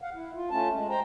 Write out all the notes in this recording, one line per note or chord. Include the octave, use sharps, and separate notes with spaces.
F5 F#5
E4
F4
A3 C#4 F4 A5
G#3
C5 G5 A#5